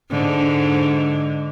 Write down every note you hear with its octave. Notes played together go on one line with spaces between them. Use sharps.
G#2 D3